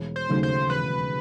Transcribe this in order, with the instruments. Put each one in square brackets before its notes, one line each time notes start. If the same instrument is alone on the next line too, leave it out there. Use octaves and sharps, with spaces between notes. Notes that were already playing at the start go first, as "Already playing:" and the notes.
Already playing: [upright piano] E1
[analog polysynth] C5
[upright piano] D#2 C#3 F#3 A3
[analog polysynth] C5
[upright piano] E1 [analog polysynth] B4